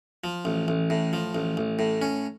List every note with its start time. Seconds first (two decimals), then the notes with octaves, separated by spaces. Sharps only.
0.24 F3
0.45 A1
0.68 A1
0.90 A2
1.13 F3
1.35 A1
1.57 A1
1.79 A2
2.02 C#4